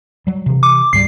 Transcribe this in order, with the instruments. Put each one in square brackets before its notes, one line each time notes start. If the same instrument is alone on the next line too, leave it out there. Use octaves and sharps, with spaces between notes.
[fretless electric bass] F#3 G3
C3 E3
[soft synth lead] D6
[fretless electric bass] D2 G#2 G3 [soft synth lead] C7